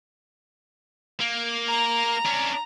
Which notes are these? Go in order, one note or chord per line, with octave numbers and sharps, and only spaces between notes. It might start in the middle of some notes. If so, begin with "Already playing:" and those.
A#3
A#5
C#4 D4